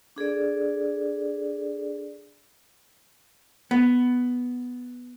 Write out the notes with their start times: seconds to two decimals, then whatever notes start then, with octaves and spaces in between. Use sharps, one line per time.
0.16 D4 G#4 A4 D5
3.71 B3